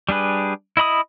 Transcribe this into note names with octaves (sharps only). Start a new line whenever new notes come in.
G3 D4 G#4 B4
E4 D#5 B5 D#6